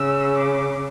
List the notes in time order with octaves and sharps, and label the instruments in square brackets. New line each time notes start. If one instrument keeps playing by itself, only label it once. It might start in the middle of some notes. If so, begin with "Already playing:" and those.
Already playing: [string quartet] C#3 [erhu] E6
[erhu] D6